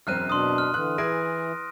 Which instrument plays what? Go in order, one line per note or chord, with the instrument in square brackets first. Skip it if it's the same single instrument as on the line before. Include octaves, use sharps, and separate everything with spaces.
[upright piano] E1 F#2 C4 [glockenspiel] F6 F#6 D#7
[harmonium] B2 D4 [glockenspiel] C6 D#6
[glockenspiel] F6
[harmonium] D3 E3 [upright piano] F#6
[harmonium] E3 [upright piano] E4 G#4 G#5 [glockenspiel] A#6 D7